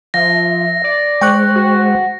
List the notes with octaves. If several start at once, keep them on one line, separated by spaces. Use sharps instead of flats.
F3 E5 A#6
D5
G#3 C5 G5 C#6 F#6
F#4